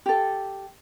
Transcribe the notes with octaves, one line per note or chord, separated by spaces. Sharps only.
G4 A4